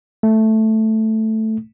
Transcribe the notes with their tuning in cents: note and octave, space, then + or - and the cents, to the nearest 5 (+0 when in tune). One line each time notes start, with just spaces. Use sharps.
A3 +0